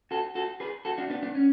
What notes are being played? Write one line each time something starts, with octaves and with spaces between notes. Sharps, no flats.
F#4 A4
F#4 A4
G#4 B4
F#4 A4
D4 F#4
B3 D4
B3 D4
C#4